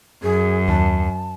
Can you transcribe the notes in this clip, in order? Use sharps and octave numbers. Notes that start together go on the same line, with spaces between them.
F#2 G#4
D#2 A5